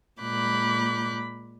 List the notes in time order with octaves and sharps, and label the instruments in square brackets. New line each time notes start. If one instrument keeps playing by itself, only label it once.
[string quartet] A#2 G#3 B5 D6 F#6 G6